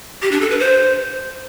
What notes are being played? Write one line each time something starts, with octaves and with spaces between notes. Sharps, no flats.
G4
D4
A4
B4
C5